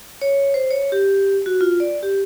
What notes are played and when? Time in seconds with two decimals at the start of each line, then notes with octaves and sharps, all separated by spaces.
0.22 C#5
0.54 C5
0.71 C#5
0.92 G4
1.46 F#4
1.61 F4
1.80 D5
2.03 G4